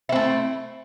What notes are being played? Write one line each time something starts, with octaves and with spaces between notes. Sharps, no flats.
A3 C4 E4